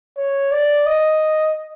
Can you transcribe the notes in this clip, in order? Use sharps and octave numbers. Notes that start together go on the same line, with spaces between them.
C#5
D5
D#5